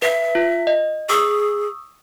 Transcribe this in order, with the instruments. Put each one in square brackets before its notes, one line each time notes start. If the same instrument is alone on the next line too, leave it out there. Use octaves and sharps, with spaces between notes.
[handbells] B4 [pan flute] E5
[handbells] F4
D#5
[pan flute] G#4 [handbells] C#6 D#6 E6